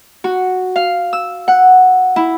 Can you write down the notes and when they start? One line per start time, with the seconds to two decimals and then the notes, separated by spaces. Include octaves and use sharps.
0.24 F#4
0.76 F5
1.13 E6
1.48 F#5
2.16 E4